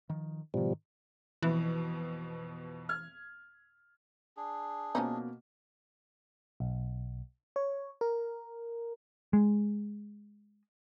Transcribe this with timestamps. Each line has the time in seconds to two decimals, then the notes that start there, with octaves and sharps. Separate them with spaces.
0.10 D#3 F3
0.54 G#2 B2 D#3 F3 G3
1.43 F2 B2 E3
2.89 F6 G#6
4.37 D4 G#4
4.95 B2 F3 A#3 C#4 D#4
6.60 B1
7.56 C#5
8.01 A#4
9.33 G#3